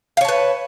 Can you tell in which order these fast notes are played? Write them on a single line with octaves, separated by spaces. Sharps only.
F5 C#5 A5 B4